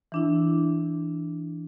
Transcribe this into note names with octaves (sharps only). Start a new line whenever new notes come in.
E3 D4 E4